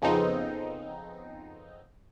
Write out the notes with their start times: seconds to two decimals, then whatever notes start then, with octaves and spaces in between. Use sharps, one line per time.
0.02 F2 C#3 F3 B3 C4 D#4